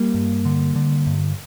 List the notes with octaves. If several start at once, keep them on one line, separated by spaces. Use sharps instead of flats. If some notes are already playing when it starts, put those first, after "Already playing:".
Already playing: G3 A#3
G2
D3
D3
G2